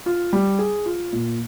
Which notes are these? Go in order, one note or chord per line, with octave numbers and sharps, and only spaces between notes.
F4
G3
G#4
F4
A#2